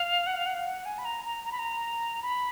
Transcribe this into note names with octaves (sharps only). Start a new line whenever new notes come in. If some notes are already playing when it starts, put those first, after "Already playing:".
Already playing: F5
F#5
F5
F#5
F5
F#5
G#5
B5
A#5
A#5
A#5
B5
A#5
B5